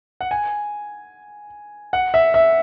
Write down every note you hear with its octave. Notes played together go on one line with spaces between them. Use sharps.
F#5
G#5
F#5
E5
E5